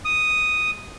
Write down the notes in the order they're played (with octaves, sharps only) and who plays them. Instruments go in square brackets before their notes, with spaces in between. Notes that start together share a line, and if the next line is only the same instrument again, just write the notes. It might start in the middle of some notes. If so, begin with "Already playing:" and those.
[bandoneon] D#6